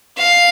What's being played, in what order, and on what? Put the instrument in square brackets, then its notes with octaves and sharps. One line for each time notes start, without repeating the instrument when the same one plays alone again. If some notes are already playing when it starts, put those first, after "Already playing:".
[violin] F5